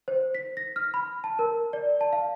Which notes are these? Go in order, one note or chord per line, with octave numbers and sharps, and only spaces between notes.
C5
B6
A#6
F6
B5
A5
A#4
D5
A5
F5